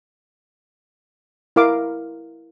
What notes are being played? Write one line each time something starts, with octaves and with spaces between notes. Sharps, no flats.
E4 A#4 F5 D6